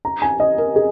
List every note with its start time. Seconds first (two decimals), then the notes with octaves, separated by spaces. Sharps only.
0.05 A#5
0.22 G#5
0.40 D#5
0.58 A#4
0.76 G#4